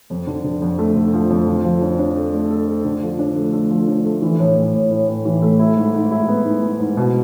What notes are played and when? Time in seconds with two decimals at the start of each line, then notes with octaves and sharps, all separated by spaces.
0.10 F2
0.27 D3
0.44 D3
0.62 F2
0.79 A3
0.96 D3
1.13 F3
1.30 F2
1.48 F3
1.65 F3
1.82 D4
1.99 D4
2.16 A4
2.33 A3
2.50 A4
2.68 A4
2.85 D3
3.02 F3
3.19 D4
3.36 A3
3.53 A3
3.70 F3
3.88 D4
4.05 A3
4.22 E3
4.39 A2
4.56 A2
4.74 A2
4.91 A2
5.08 A2
5.25 E3
5.42 A3
5.59 E4
5.77 G#2
5.94 G#2
6.11 E4
6.28 B3
6.45 G#2
6.63 G#2
6.80 G#2
6.97 B2